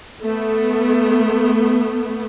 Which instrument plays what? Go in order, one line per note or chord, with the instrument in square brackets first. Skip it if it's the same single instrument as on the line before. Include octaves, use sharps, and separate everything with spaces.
[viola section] A3 B3